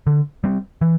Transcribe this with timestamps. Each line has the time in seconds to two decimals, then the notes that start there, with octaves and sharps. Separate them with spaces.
0.07 D3
0.44 G3 C4
0.81 E3